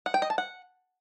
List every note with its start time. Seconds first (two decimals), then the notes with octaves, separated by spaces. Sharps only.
0.06 F#5
0.14 G5
0.22 D#5
0.30 A5
0.38 F#5